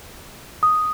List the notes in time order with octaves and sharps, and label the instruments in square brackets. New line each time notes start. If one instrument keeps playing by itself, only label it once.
[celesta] D#6